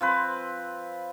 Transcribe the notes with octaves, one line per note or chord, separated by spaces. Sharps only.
F3 C4 B4